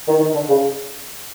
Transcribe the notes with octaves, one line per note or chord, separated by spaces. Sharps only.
D#3
D#3
D3
C#3